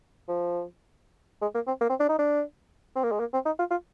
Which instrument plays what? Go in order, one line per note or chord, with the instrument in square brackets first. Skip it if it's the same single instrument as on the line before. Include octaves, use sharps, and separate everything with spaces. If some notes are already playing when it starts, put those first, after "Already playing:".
[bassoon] F3
G#3
A#3
C4
A#3
C4
D4
D#4
D4
C4
A#3
G#3
A#3
C4
D#4
F4
F4